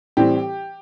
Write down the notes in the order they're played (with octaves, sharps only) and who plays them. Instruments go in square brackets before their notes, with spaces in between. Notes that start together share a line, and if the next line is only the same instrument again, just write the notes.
[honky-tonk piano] A2 E3 G3 C4 G4